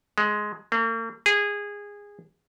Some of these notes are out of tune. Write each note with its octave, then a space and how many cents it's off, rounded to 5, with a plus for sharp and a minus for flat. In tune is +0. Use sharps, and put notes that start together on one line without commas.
G#3 +10
A#3 -45
G#4 -20